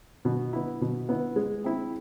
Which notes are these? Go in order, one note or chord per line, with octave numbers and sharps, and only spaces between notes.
B2
B3 E4
B2
B3 E4
G#3
C4 E4